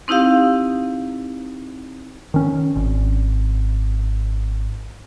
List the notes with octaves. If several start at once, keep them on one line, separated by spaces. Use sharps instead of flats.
C4 D#4 E4 G4 F5
D#3 C#4
G#1